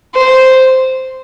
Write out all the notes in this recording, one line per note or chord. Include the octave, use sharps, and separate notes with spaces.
C5